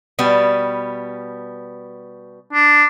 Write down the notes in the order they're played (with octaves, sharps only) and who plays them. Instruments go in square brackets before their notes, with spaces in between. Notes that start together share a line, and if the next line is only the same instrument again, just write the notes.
[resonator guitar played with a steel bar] B2 G3 B3
[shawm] D4